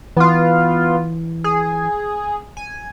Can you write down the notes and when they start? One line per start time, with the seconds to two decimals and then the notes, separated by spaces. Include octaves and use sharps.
0.17 E3 B3 F4
1.44 G#4
2.57 G#5